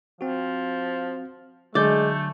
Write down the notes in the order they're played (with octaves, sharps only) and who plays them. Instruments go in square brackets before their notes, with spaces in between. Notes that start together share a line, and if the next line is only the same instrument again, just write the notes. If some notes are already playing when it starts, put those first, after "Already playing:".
[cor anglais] F3 [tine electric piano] C4 F#4
[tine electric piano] D3 F#3 G6 [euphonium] G#3 [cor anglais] A3 [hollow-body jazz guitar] D5